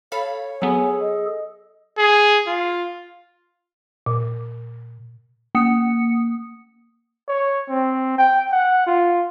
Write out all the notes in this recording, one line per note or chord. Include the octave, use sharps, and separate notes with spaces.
A4 C#5 F5 B5
F#3 B3 G#4 A4 G#5
D#5
G#4
F4
A#2
A#3 D#6 C#7
C#5
C4
G5
F#5
F4